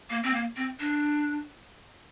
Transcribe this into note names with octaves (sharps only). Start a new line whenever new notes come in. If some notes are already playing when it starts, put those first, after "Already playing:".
A#3
C4
A#3
C4
D4